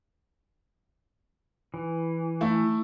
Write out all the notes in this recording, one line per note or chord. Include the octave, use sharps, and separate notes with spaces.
E3
A3 E4